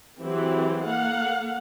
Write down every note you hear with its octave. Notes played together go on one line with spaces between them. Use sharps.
E3 F#3 C4 G4 G#4
A#3 A4 F5 F#5